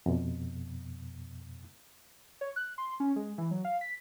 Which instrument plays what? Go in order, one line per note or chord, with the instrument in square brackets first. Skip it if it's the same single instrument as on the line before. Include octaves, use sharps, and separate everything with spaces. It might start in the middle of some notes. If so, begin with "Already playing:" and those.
[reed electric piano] F2 B2
[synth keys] C#5
F#6
C6
C#4
G#3
E3
F#3
F5
B6